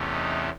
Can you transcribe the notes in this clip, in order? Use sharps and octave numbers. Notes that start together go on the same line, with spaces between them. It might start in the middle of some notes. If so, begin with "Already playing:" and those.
Already playing: E2 C3 E3 A3 C#4
D#4